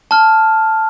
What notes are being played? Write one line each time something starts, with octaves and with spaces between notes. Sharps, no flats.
A5 F6